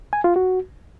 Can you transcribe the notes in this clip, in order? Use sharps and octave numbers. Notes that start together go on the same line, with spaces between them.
G#5
F4
F#4